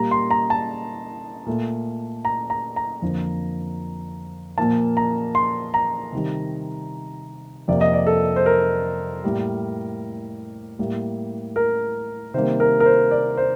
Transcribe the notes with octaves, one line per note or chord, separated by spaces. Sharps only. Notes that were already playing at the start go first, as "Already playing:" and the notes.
Already playing: A#2 G3 A#3 A#5
C6
A#5
A5
A#2 A3
A#5
A#5
A#5
F2 D3 F3 A#3
A#2 F3 A#3 A5
A#5
C6
A#5
C3 D#3 G3
F2 C3 F3 A#3 D5
D#5
D5
A4
C5
A#4
A2 G3 A#3
A2 G3 A#3
A#4
C3 D#3 G3 A#3 C5
A#4
A#4
C5
D5
C5